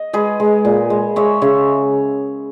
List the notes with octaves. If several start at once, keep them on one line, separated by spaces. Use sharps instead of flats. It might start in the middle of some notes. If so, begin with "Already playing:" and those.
Already playing: D#5
G#3 G#4 B4
G#3
A#2
G#3
G#3 C#5 E5
C#3 C#5 E5